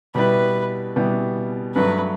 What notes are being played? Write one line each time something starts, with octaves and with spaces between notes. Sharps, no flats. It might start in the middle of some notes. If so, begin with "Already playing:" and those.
B2 G3 B3 E4 B4
B2 G3 B3 E4
G2 F#3 A3 B4